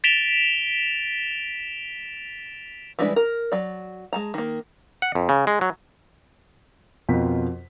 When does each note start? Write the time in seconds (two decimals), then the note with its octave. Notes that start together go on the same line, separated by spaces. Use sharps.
0.04 A6 B6 D7 E7 F7 G7
2.99 E3 G3 G#3 D4 B4
3.16 A#4
3.52 F#3 D5
4.13 G#3 A5 A#5
4.34 D#3 A#3
5.02 F#5
5.15 F2
5.29 C#3
5.47 G#3
5.61 F#3
7.09 F2 B2 F4 A#4 B6